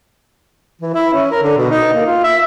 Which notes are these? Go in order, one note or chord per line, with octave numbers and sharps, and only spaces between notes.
E3
E4
C#4
A#4
D3
B2
D#4
A#3
F4
E5